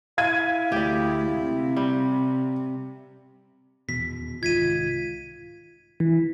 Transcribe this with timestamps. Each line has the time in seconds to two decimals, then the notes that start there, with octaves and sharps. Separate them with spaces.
0.18 E4 F5 G#6 D#7
0.72 D2 G4 D5
1.33 C3
1.76 G3
3.89 D#1 E2 B2 B6
4.43 C2 G#2 D#3 F4 G#6 B6 D#7
6.00 E3